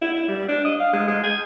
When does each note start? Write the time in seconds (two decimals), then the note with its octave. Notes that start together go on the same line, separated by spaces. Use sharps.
0.01 E4
0.14 E4
0.28 G3
0.48 D4
0.65 D#5
0.80 F5
0.93 G#3
1.07 G#3
1.23 G#5